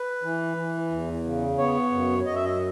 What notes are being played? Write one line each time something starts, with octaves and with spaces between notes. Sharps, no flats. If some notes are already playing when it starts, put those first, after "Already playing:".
Already playing: B4
E3
E3
E2
C#3
B3 C#5
F#2
F#2 D#5
E5
D#5